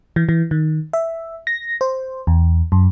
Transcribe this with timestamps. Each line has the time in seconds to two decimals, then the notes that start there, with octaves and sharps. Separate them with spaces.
0.16 E3
0.29 E3
0.51 D#3
0.93 E5
1.47 A#6
1.81 C5
2.27 E2
2.72 F#2